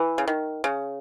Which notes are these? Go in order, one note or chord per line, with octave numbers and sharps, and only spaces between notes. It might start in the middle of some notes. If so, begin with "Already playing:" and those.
Already playing: E3
C#3
D#3
C#3